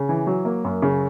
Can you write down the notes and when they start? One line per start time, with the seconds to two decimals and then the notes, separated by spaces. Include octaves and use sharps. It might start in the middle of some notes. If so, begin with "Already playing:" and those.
Already playing: C#3
0.09 E3
0.27 F#3
0.45 A#3
0.65 F#2
0.82 C#3